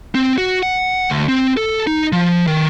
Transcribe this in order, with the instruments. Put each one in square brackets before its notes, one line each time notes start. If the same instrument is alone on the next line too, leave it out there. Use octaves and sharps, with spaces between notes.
[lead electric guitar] C4
F#4
F#5
D2
C4
A4
D#4
F3
D#3